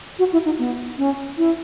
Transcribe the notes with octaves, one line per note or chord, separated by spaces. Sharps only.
F#4
E4
D#4
B3
C#4
E4